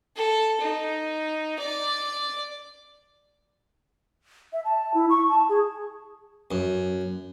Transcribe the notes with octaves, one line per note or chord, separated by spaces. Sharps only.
A4
D#4
D5
E5
A5
E4
C#6
A5
G#4
F#2